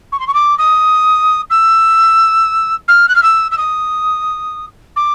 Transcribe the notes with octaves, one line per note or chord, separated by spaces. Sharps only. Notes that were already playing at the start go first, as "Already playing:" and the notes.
C#6
C6
C#6
D6
D#6
E6
F6
F#6
F6
E6
E6
D#6
D6